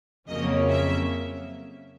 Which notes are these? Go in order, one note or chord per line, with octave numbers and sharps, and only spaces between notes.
F2 C#3 F#3 A#3 C#4 D#5
E5